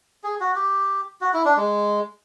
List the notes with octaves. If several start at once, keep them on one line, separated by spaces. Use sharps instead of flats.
G#4
F#4
G4
F#4
E4
D4
G#3